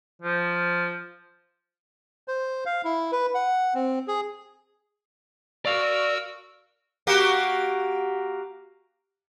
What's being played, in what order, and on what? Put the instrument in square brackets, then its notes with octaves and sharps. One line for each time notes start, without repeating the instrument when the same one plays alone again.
[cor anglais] F3
[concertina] C5
F5
E4
B4
F#5
C4
G#4
[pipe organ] F#4 A#4 E6 [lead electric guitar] D5 F5
[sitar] A#3 F#4 G4